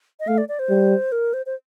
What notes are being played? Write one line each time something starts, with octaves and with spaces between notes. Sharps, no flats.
D#5
A3 F5
D5
D5
C5
G3
A#4
C5
C5